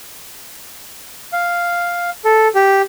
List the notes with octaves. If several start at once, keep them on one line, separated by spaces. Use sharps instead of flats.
F5
A4
G4